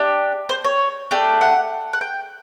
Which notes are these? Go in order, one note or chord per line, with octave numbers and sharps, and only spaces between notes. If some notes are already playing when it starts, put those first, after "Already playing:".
Already playing: D4 G4
C5
C#5
A3 D4 G4
F#5
F#5
G5